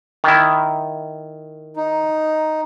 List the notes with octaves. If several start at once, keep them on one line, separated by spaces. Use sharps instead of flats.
D#3 E4
D#4